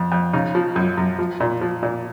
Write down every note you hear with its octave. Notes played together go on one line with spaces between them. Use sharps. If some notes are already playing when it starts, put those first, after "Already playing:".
Already playing: F2
F2
C#3 D#4
F3
F#2
F#2
F3
A#2
F3
A#2